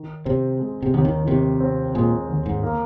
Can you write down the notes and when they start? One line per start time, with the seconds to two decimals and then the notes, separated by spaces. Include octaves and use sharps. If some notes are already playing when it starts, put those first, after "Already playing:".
Already playing: D#3
0.25 C3 C4
0.59 G#3
0.82 C3
0.94 D#2 C3
1.05 D#3
1.27 C3 D#3
1.60 C4
1.95 A#2 G#3
2.29 D#2
2.46 G#2
2.63 A#3